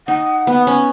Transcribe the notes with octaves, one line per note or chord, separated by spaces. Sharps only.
D#4 F#5
B3
C#4